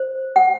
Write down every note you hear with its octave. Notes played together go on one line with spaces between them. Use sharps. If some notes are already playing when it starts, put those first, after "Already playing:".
Already playing: C5
F#5